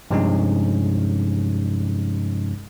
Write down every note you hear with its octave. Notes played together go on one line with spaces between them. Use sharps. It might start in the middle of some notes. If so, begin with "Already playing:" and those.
G2 C3 F3 G#3 C#4 D#4